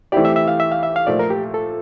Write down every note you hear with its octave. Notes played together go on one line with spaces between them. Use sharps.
E3 A3 C4 E4 G4 D5
E5
E5
F5
E5
F5
E5
F5
A#2 F3 A3 D5
A#4
G4
A4